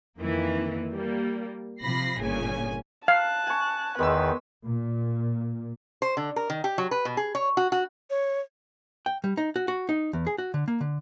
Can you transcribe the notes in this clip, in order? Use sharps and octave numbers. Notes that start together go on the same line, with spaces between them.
F2 D#3 E3 A#3
G3 A#3
C3 F3 B5 A#6 C7
G1 A#2 C#3 C#4 G#5
F5 A5 F#6
G#5 C#6
E2 D#3 G#3 B4 C#6 E6
A#2
C5
D3
A#4
D#3
G4
F#3
B4
B2
G#4
C#5
F#4
F#4
C#5
G5
G3
D#4
F#4
F#4
D#4
E2
G#4
F#4
D3
A#3
D3